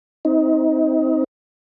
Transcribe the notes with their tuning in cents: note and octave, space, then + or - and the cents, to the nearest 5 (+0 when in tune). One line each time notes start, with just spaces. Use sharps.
C4 +0 D#4 +30